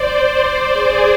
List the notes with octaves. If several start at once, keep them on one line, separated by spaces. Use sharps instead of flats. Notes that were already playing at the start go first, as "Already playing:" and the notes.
Already playing: C5 D5
C5
G#4